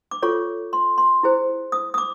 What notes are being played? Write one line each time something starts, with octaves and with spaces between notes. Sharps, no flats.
D6
F4 A4 C#5 C#6
C6
C6
E4 G#4 C5
D#6
D#6
D6